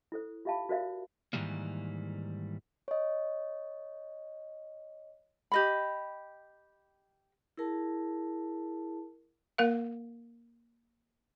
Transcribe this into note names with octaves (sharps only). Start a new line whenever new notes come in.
E4 A4 C5
F4 G4 E5 F5 A5 B5
F#4 A#4 C5 D5 E5 F5
G#2 B2 D#3 E3 G3 A#3
C#5 D#5
G4 D#5 B5
E4 G#4 A#4 A5
A#3 A#4 F5